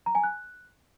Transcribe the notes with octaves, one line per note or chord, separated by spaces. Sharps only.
A#5
G#5
F#6